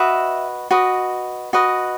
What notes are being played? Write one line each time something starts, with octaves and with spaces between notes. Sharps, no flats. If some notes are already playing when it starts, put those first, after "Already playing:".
Already playing: F#4 B4 D#5 E5
F#4 B4 D#5
F#4 B4 D#5